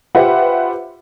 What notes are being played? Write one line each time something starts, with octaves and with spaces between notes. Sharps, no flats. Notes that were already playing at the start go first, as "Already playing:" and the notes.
F4 G4 B4 C5 E5 F#5